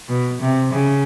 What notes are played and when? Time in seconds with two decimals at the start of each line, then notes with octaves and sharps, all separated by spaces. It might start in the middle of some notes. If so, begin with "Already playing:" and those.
0.09 B2
0.41 C3
0.72 C#3